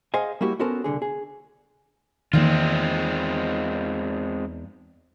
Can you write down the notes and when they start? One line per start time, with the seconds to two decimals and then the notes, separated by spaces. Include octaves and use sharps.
0.14 G#4 C5 D#5 F5 F#5 G#5
0.41 G3 A#3 E4 F#4 G4
0.59 B3 C#4 F#4 A4 A#4 C5
0.84 C2 G#2 D3 G#4
1.02 G#4
2.33 E2 D#3 G#3 A#3 C4 D#4 F4